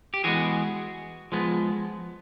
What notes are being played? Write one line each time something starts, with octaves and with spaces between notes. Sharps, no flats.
G4
E3 G#3 B3 F#4 G#4
F3 G#3 B3